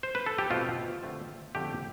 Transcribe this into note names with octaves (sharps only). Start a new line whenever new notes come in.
C5
B4
A4
G4
B2 A3 C4 F4
D3 A3 C4
F2 D3 A3 G4